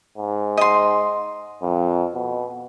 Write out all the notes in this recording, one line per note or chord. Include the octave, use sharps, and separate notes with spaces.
G#2
D#5 C6
F2
B2